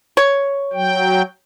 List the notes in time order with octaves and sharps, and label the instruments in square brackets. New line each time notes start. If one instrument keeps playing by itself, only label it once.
[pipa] C#5
[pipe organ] F#3 G5